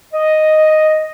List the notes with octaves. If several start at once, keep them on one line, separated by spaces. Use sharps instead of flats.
D#5